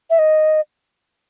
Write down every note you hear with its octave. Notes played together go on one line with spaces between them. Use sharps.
E5
D#5